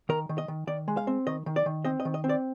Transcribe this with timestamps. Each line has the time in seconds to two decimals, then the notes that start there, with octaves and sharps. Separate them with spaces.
0.09 D#3 A#4
0.29 D#3
0.38 D#5
0.48 D#3
0.67 D#3 D5
0.88 G#3
0.97 F5
1.07 C4
1.27 D#3 D#5
1.46 D#3
1.56 D5
1.66 D#3
1.85 C4 D#5
2.00 D#5
2.05 D#3
2.14 D#5
2.24 C4
2.29 D5